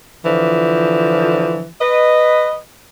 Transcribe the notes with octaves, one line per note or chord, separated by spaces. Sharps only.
D3 E3 F3
B4 D#5